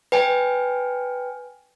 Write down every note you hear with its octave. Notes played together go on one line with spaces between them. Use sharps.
B4 G5 G#5